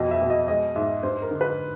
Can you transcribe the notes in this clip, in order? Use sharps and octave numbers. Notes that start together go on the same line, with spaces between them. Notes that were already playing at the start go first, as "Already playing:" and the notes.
Already playing: F2 B2 D#5
E5
B2
D#5
G#3 D#5
G#2 E5
G2 C5
A#4
D3
B4